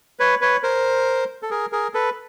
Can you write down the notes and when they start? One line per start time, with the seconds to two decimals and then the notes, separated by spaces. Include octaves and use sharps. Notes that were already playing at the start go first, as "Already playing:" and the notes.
0.19 B4 C#5
0.41 B4 C#5
0.63 A#4 C5
1.43 A4
1.50 G#4 A#4
1.72 G#4 A#4
1.94 A4 B4